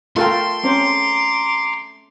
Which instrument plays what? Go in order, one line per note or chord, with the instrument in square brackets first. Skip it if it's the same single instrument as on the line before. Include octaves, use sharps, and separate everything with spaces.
[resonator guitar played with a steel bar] A3 A4 G5 [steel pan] F4 A#4 F5 [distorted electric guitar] C6
[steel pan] C4 C#4 C5 [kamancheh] A#5 D6